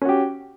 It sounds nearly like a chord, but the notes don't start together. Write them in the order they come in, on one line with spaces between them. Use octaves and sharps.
C#4 F#4 G4